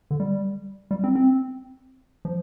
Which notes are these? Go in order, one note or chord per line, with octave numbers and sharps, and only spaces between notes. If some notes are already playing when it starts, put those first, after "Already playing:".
D3
G3
G3
C4
C4
F3